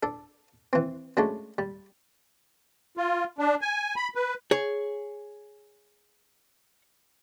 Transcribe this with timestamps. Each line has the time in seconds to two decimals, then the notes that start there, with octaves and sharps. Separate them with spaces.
0.03 D4 A4
0.73 E3 C4
1.17 F#3 G#3 A3 C#4 D4
1.58 G3
2.97 F4
3.39 D4
3.62 G#5
3.96 B5
4.15 B4
4.51 G#4 C#5